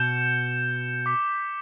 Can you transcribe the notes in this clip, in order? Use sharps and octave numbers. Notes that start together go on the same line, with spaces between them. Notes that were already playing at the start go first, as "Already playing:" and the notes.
Already playing: B2 G6 C#7 E7 G7
D6 G6 B6